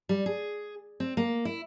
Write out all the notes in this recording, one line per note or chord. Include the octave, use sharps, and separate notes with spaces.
G3
G#4
C4
A#3
E4